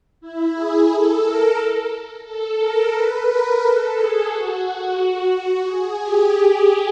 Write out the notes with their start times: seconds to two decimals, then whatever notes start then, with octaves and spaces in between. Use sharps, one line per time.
0.21 E4
0.55 G#4
0.89 A4
1.22 A#4
2.25 A4
2.60 A#4
2.93 B4
3.27 A#4
3.62 A4
3.95 G#4
4.29 F#4
4.64 F#4
5.65 G#4
5.99 G4